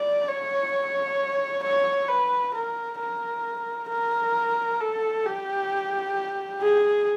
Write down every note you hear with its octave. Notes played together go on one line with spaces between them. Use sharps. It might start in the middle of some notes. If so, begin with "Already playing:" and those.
Already playing: D5
C#5
C#5
B4
A#4
A#4
A#4
A4
G4
G#4